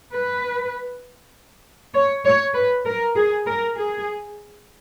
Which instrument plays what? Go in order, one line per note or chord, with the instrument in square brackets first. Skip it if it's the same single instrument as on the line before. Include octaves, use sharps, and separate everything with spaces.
[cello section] B4
C#5
C#5
B4
A#4
G#4
A#4
G#4